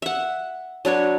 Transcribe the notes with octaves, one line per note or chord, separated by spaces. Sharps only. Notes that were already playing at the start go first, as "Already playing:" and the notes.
E5 F#5
F#3 D4 B4 C#5